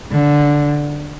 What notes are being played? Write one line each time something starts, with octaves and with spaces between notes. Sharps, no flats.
D3